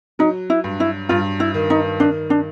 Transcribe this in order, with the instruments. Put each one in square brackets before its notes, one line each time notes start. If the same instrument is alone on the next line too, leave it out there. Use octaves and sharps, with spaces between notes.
[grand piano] F#3 [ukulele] D#4
[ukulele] E4
[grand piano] G2
[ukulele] E4
[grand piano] G2 [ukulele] F4
[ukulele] E4
[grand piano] D#3
[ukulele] D#4
[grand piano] D#3 [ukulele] D4
[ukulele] D4